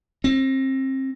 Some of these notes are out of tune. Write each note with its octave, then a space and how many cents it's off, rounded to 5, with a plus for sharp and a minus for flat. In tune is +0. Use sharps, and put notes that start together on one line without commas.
C4 +30